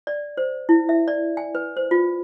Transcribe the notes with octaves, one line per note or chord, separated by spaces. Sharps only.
D5
C5
E4
E5
D5
G#5
B4
C5
F4